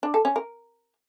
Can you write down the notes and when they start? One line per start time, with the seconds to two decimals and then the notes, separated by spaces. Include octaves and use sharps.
0.03 D4
0.14 A4
0.25 C#4
0.36 A#4